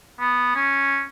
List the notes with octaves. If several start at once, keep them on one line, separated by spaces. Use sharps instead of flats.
B3
C#4